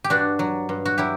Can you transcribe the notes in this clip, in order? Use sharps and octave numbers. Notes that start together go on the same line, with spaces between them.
G4
G2 D4 F#4
F#3
G2
F#4
F#3 E4 G4